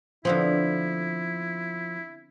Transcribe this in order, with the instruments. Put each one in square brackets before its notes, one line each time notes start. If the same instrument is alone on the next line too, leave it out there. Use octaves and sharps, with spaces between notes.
[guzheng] D3 B3 C4 [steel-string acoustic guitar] F3 [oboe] E4